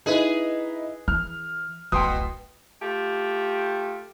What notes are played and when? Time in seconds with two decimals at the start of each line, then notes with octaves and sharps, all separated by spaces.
0.06 D#4 E4 G#4 B4 E5
1.08 E3 F6
1.92 D1 A1 B2 G5 C6 D#6
2.82 A3 F4 G4